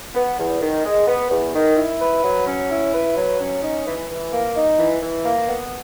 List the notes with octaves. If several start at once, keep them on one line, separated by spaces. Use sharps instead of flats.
B3
E2
D#3
G#3
B3
E2
D#3
E4
B4
F#3
C#4
E4
B4
F#3
C#4
D#4
E3
E3
A#3
D#4
E3
E3
A#3
B3